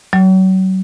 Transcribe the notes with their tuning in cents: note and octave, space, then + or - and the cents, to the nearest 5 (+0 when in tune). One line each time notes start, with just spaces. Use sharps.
F#3 +30